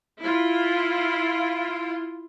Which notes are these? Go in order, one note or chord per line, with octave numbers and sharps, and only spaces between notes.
E4 F4